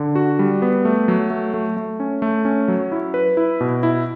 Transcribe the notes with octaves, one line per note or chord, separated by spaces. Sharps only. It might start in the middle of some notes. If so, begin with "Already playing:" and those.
Already playing: D3
F#4
G3
B3
A3
F#3
A3
A3
A3
C#4
A3
C#4
F#3
E4
B4
E4
B2
E4